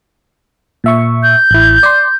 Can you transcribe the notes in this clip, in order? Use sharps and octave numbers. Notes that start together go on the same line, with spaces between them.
A#2 E5 C#6
G6
A1 E4
D5 C6